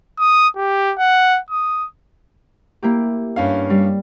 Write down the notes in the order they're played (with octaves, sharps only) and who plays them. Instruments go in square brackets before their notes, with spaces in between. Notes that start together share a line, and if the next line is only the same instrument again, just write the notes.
[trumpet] D#6
G4
F#5
D#6
[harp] A#3 E4 G4
[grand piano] G2 C#4 F5
[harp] G3